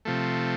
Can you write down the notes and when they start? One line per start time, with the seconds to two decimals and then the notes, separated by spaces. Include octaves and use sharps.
0.05 C3 F3 A3